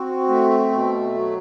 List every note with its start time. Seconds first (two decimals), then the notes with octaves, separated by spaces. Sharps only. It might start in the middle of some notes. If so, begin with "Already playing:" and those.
Already playing: C4 F#4
0.28 A3
0.71 B2
1.14 F#3